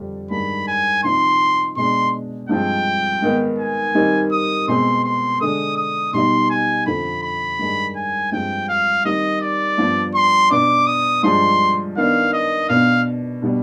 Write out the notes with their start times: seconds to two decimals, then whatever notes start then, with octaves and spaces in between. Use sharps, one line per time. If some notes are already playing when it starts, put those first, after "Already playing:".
Already playing: F2 D3 G3 D4
0.30 G2 D#3 G#3 D4 B5
0.67 G#5
1.03 C3 F3 C4 D#4 C6
1.76 B2 G#3 D4 C6
2.49 G2 F3 G#3 C4 G5
3.22 G#2 D#3 B3
3.58 G#5
3.95 D#3 G3 C4 D#4
4.31 D#6
4.68 B2 G#3 C4 C6
5.04 C6
5.41 D3 G#3 D4 D#6
5.77 D#6
6.13 B2 G3 B3 D#4 C6
6.50 G#5
6.86 F2 D3 F3 B5
7.23 B5
7.59 G2 D#3 G#3 D4
7.96 G#5
8.32 G2 F3 G#3 C4 G5
8.68 F5
9.05 D#3 G3 C4 D#4 D#5
9.41 D5
9.78 G2 F3 B3 D4
10.14 C6
10.51 B2 B3 D4 D6
10.87 D#6
11.23 G2 F3 G#3 D4 C6
11.96 D#3 B3 D4 F5
12.33 D#5
12.69 B2 B3 D4 F5
13.42 B2 G3 B3 D4